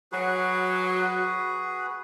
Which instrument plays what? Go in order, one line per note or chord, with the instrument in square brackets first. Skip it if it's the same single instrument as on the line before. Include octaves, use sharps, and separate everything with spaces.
[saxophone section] F#3 [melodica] F#4 G#4 B4